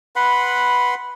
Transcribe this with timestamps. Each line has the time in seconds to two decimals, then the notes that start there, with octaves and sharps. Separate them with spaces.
0.16 B4 F#5 B5 C6